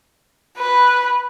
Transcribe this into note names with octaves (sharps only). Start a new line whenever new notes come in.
B4